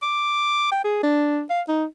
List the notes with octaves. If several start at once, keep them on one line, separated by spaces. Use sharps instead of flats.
D6
G5
G#4
D4
F5
D#4